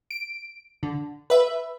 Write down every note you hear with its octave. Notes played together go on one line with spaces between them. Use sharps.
D7
D3
B4 E5